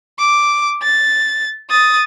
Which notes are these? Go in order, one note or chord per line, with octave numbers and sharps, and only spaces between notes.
D6
A6
D#6 A6